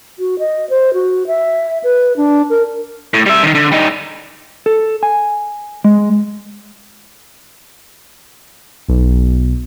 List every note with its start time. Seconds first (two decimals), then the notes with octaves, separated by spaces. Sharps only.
0.19 F#4
0.39 D#5
0.70 C5
0.94 F#4
1.27 E5
1.84 B4
2.17 D4
2.50 A#4
3.14 A2
3.26 G3 E5
3.43 D3 D#3
3.55 D3
3.72 G3 D#4
4.66 A4
5.03 G#5
5.84 G#3
8.88 B1